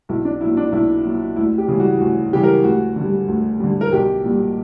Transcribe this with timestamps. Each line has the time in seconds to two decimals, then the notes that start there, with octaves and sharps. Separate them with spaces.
0.09 B1 E4
0.25 D4
0.41 A#2 F#3 E4
0.57 D4
0.72 B1 E4
1.05 A#2 F#3
1.36 D2 E4
1.58 G4
1.68 C#3 E3 G3
1.80 F#4
2.00 D2 F#4
2.33 C#3 E3 G3 G4
2.43 A#4
2.64 D2 F#4
2.96 D3 G3
3.28 D2
3.60 D3 G3
3.81 A#4
3.92 B1 G4
4.24 A#2 G3